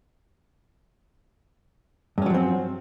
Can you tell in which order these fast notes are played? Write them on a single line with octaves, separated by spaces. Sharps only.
G2 C#4 F#3 F3 C4